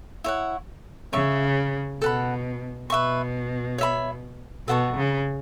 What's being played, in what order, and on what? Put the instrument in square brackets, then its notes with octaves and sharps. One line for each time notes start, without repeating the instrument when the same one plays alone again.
[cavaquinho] E4 C#5 F#5
[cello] C#3 [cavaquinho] C#5 E5 C#6
[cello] B2 [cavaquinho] A4 F#5 B5
[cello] B2 [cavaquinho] B4 E5 C#6
[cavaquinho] C#5 E5 B5
[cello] B2 [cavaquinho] A4 F#5 A5 C#6
[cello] C#3